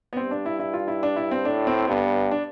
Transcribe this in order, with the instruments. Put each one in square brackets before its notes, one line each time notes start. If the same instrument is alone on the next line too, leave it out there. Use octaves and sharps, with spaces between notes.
[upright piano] B3
[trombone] G2 [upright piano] C4
[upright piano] D4
E4
E4
F4
E4
D4
E4
C4
[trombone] A2 [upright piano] D4
[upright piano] C4
[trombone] G2 [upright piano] B3
[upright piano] D4